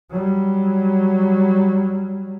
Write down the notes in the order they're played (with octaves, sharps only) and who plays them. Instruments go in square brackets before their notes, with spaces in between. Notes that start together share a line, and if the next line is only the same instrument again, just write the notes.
[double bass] F#3 G3